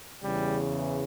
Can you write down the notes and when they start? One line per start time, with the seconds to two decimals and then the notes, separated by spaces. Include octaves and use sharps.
0.23 E2 C#3 E3 G3